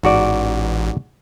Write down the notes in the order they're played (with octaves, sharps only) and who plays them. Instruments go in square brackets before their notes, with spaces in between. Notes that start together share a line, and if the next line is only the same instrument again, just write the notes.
[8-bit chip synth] A1 [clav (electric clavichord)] G#2 F#4 D5